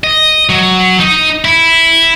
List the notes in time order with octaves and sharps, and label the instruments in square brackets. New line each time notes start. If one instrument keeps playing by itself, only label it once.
[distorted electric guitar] D#5
F#3
D#4
E4